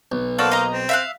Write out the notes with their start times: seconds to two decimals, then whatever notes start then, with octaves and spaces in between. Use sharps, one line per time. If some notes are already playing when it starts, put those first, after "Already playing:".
0.12 B1
0.39 A#3 F#4 A4 C5 D5 F5
0.52 D#5 A#5
0.71 C4
0.89 E5 F5 F#6